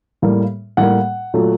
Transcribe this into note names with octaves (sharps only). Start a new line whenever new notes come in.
A2 G3 A#3
A2 G3 A#3 F#5
A#2 F#3 A3